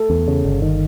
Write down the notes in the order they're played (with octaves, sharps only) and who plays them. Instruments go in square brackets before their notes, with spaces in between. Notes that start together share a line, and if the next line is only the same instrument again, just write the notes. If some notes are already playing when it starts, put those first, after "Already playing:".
Already playing: [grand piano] A3 A4
[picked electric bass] E2
C#3
G1
D#3